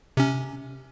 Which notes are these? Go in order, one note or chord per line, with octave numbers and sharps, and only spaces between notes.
C3 C#4